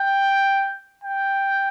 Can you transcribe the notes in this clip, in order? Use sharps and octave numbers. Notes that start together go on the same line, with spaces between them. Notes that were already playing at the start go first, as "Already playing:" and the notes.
Already playing: G5
G5